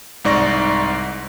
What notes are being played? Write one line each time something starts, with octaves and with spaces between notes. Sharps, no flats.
C2 G#2 D5 C#6 A#6